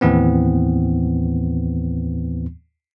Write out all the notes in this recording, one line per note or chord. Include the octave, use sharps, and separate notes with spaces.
D#2 A2 E3 B3 C4